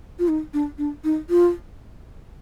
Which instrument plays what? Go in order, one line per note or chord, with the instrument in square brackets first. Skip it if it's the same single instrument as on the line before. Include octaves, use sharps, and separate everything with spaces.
[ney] F4
D#4
D4
D4
D#4
F4